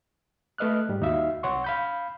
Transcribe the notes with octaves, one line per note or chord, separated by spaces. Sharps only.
A3 B4 D#5 F6 F#6
G#2 G3
D#2 D#4 F#4 E5 F5
C2 C#5 F#5 C6 C#6
F5 B5 G6